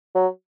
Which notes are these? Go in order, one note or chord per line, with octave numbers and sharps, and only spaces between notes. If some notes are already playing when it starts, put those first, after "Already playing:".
F#3